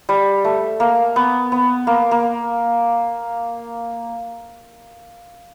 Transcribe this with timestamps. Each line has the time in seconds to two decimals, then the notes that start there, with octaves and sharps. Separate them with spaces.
0.09 G3
0.44 A3
0.80 A#3
1.16 B3
1.52 B3
1.87 A#3
2.11 A#3